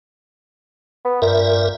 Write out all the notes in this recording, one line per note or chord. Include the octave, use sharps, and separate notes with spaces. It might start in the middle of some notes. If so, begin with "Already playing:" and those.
B3
G2 A#2 A#4 E5